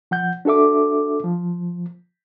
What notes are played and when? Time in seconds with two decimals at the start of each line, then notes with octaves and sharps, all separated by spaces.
0.11 F3 F#5 G6
0.45 D4 F#4 A4 E5 D6
1.24 F3